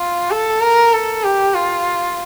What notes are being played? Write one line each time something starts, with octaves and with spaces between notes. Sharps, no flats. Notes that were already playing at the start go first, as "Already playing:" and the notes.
Already playing: F4
A4
A#4
A4
G4
F4